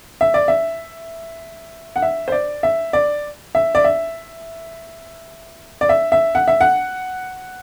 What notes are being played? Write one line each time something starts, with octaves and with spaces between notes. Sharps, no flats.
E5
D5
E5
F#5
E5
C5
D5
E5
D5
E5
D5
E5
D5
E5
E5
F#5
E5
F#5